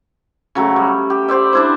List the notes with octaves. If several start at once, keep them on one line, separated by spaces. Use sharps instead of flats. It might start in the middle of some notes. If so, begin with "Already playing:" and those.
C#3 F#3 A3
G3
G4
G4 C5 D5 E5
D4 E4 C5